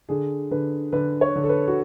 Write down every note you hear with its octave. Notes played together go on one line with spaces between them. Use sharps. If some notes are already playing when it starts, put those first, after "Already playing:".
D3 G#4
D3 B4
D3 B4
C#5
D3
A4
B4
F#4